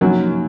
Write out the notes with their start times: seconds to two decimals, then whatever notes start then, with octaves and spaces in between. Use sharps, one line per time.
0.01 F#2 C3 F3 F#3 A#3 D#4